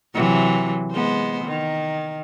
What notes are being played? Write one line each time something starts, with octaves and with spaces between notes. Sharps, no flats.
C3 E3 F#3
G#3 B3 C5
D#3